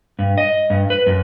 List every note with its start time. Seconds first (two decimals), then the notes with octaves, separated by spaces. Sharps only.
0.19 G2
0.38 D#5
0.70 G2
0.90 B4
1.06 F#2